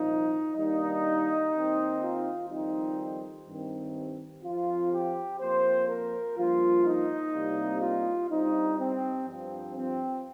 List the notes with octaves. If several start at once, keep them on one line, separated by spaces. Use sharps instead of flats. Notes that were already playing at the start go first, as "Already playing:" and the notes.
Already playing: C2 A#2 F3 A#3 D#4
G2 D#3 G3 A#3 D#4
D#2 D#3 C4
F4
F2 D#3 G3 C4 D#4
G2 D#3 C4
F2 F3 C4 F4
G4
F2 F3 A#3 C5
A#4
G2 F3 A#3 F4
D#4
C2 C3 G3 A#3
F4
G2 G3 C4 D#4
C4
G2 F3 C4
C4